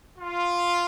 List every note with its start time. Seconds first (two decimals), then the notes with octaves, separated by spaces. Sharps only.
0.18 F4